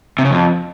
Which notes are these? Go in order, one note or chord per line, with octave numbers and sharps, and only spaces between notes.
C3
C#3
F2